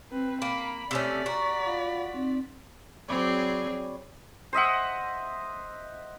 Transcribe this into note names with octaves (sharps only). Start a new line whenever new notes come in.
C4 B4
A#3 B5
C3 A3 C#4 D5 B6
F#4 G4 A#5 C#6
F4 F5 B5
C4 D#4 C6
F#3 C4 G#4 C#5 D5 B5
C5 D#5 E5 F#5